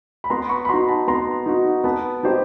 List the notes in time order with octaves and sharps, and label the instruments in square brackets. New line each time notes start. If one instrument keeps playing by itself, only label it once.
[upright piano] B5
[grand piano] B3 [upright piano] A#5 C6
[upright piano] B5 C#6
B5
[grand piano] D#4 F#4 [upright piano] A#5 C6
[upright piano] A5 B5
[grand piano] B3 [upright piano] A#5 C6
[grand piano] D#4 F#4
[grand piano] B3 [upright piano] A5 B5
[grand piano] D#4 G4 C5